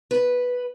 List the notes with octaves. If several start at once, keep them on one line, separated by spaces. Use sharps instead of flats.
B4